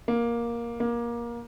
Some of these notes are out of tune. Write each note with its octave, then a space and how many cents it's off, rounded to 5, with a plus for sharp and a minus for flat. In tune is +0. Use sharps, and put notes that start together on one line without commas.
A#3 +10
A#3 +20